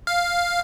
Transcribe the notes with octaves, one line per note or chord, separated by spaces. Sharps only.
F5